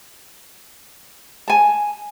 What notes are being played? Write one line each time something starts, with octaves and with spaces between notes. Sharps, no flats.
G#5 A5